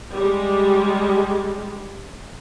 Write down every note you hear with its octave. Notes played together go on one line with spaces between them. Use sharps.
G3 G#3